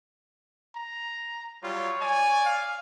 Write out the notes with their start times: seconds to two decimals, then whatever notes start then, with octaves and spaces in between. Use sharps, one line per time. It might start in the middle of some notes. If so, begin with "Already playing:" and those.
0.76 A#5
1.63 F#3 G3 F4 C#5
2.01 D5 G#5
2.45 F5